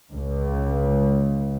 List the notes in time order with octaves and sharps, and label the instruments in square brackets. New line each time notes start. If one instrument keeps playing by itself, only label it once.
[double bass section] C#2